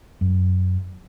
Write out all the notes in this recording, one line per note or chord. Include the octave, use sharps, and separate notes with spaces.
F#2